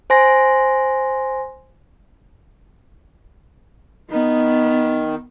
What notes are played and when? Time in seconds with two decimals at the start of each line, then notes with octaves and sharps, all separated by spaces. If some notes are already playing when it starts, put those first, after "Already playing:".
0.10 C5 G#5 C6 A#6
4.10 D#3 B3